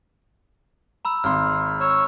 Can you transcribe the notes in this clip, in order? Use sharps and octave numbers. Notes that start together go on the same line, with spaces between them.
A#5 B5 E6
G#1 C6 F6
C#5 E6